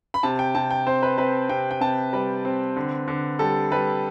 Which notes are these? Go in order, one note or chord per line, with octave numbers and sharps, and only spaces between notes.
B5
C3 A5
G5
C3 A5
G5
C4 C5
B4
C4 B4
C3 G5
G5
C3 A5
G3 B4
C4
D3
D3
G3 A4
G3 B4